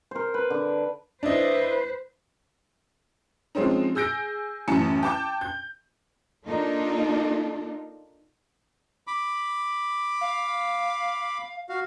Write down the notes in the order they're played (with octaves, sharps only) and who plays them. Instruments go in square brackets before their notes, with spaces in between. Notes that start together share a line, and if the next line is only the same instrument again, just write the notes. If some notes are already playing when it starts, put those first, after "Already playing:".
[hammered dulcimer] A#4 C5
B4
D3
[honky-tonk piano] D4 E4 D#5 [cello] B4 C5
[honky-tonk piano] F3 G#3 C4 C#4 D#4
G#4 E6 G6 A#6 D7
A1 F#2 A2 E3 A5 C#7
G5 A5 D6 G6
G6
[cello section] A#3 D4 D#4 F4 A4
[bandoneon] B5 D6
[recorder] F5
[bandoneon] F#4 F5